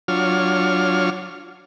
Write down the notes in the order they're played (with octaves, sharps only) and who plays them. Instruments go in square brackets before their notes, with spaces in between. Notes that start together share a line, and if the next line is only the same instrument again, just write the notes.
[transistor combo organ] F#3 D4 F4 C#5 F6